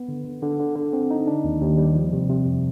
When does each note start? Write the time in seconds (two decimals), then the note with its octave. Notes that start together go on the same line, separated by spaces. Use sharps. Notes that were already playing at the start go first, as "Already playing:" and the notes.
Already playing: B3
0.08 D3
0.25 D3
0.42 D3
0.59 D3
0.76 D3
0.93 C4
1.11 D#4
1.27 D4
1.44 D#2
1.61 D#2
1.78 G3
1.95 F3
2.13 C3
2.29 C3
2.46 F2